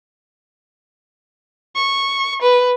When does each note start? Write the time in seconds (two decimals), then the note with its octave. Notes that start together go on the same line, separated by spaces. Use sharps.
1.75 C#6
2.42 B4